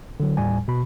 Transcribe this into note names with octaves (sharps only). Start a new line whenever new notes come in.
D3 F#3
D#2 A2 G3 G#5
B2 B5